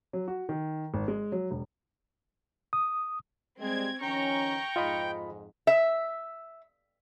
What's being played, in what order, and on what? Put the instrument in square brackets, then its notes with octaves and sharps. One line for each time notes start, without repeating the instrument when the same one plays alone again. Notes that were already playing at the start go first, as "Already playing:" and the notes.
[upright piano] F#3
F#4
D#3
G#1
G#3
F#3
E1
[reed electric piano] D#6
[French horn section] G3 G#3 [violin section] C4 G#6
[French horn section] D#3 F3 C#4 [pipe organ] G5 [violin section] A#5 C#6
[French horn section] F2 G#2 [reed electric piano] F4 D#5 B5
[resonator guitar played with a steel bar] E5